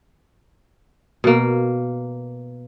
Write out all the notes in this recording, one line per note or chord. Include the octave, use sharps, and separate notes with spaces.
B2 A#3